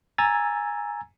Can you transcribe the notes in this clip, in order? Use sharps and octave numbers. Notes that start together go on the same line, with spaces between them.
G#5 A#5 E6 G#6 A6